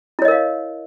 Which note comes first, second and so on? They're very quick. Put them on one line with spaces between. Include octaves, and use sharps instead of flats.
E4 C#5 D#5 A#4 F5